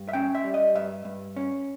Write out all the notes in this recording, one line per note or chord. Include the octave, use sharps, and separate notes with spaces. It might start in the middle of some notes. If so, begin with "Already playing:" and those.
Already playing: G2
E5
C#4 G5
E5
G3
D#5
G2 E5
G2
C#4